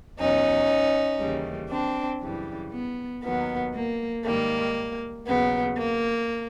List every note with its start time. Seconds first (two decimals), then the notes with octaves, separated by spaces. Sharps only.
0.18 E2 B2 F#3 C#4 D#4
1.20 D#2 C#3 E3 G3
1.71 C4 D4
2.22 F#2 C#3 E3 G3
2.72 B3
3.24 D#2 D#3 F#3 B3
3.75 A#3
4.25 G#2 D#3 G3 A#3
5.26 D#2 C#3 F#3 B3
5.78 A#3